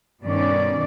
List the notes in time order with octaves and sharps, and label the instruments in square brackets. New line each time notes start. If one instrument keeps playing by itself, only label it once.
[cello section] G2 B2 D#3 C#4 D5